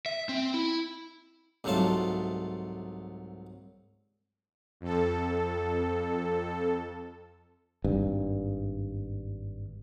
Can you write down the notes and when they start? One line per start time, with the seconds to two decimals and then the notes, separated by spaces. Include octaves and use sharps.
0.06 E5
0.29 C4
0.54 E4
1.64 C2 G#2 F#3 A3 F4 A5
4.81 F2 A4
7.84 G#1 G2